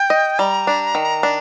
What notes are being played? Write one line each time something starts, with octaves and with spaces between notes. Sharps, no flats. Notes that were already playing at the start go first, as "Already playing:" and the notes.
Already playing: G5
D#5
G3 A#5
D4
D#3
D4